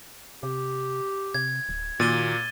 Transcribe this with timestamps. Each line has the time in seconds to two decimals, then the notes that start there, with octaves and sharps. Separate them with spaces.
0.43 C3 G4
1.34 C3 G#6
1.69 D1
2.00 A#2 D#3 A#3 F#4 A6 D#7 G7